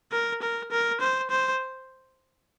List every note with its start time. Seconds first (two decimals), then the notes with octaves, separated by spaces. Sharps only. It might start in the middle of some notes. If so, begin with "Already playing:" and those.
0.12 A#4
0.42 A#4
0.71 A#4
1.01 C5
1.30 C5